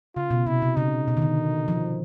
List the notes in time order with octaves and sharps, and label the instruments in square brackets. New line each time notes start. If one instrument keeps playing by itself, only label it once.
[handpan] C#3 [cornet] F4
[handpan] B2
[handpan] C3 [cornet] E4
[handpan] C3
[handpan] C#3 [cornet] D#4
[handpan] B2
D#3
D3
F3